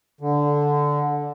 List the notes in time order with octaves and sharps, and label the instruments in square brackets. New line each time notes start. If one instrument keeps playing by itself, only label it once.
[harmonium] D3